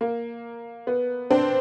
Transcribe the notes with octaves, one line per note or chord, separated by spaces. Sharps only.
A#3
B3
C4 D4